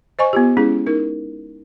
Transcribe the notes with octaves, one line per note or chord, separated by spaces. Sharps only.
C5 D#5 G#5 C#6
B3 F4 G4
G#3 C#4 E4 G#4
D#4 A#4